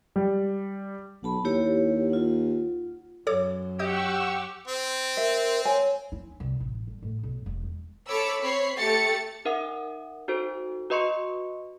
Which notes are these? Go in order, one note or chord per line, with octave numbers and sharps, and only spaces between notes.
G3
B1 F#5 A5 B5
D#2 E4 G4 C#5
F4 F#5
F#2 F#3 A4 C#5 D6
G4 D#5 F#5 C#6 D#6 E6 G6
C4
A#4 E5
C#5 G#5
E4
C2
A1
G1
A2
B1
E1
D#3
A4 C#5 B5 D6 E6
C4 C#5 B5 C7
A3 G4 A6 C#7
D#4 A#4 E5 F#5 D#6
D#4 F#4 A4 C5
F#4 B4 D#5 C6 C#6 C#7